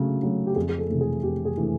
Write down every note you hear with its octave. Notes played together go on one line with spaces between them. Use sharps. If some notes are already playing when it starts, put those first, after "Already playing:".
Already playing: C#3 F#3 A3
F#3 A3
G4
F2 G#4
G#4
A4
C3 E3 A3
G#4
F2 G4
G#4
C3 E3 A3